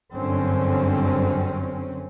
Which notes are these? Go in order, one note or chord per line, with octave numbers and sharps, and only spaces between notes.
G1 F#2 D3 C4 C#4